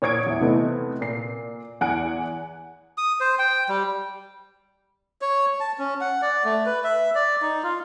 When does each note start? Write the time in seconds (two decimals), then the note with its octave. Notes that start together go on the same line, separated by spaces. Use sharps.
0.02 A#2 C#5 D#6 G#6 C#7 D7
0.26 E2 E5
0.41 C3 E3 A3 B3 D#4
1.01 A#2 C7
1.81 E2 F#5 G#5 F#6 D7
2.98 D#6
3.20 C5
3.39 G5
3.69 G3
5.22 C#5
5.60 A5
5.79 C#4
6.01 F#5
6.22 D5
6.44 A3
6.66 B4
6.84 E5
7.15 D5
7.42 D#4
7.63 F4